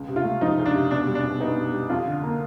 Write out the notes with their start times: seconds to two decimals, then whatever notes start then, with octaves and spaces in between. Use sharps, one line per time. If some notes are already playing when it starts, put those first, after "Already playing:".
Already playing: C#2
0.08 C3
0.16 F4
0.24 A3
0.41 F3 D#4
0.58 C#2
0.66 D4
0.74 C3
0.91 B2 D4
1.07 G3
1.15 D4
1.23 B2
1.40 B3 D#4
1.57 B2
1.73 G3
1.89 F2 F4
2.06 D3
2.23 A#3